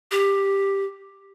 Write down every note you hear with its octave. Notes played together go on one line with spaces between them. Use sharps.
G4